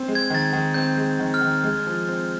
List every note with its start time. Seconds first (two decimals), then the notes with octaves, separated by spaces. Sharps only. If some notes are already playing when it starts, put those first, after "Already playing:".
Already playing: C4
0.08 G#3
0.15 G#6
0.30 D#3 A6
0.45 G#6
0.53 D#3
0.74 C4 G6
0.97 G#3
1.19 D#3
1.34 F6
1.41 D#3
1.63 G#3
1.87 F3
2.09 C4